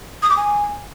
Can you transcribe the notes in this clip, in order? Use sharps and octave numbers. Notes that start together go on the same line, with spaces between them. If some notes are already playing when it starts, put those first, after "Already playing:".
D#6
D6
G#5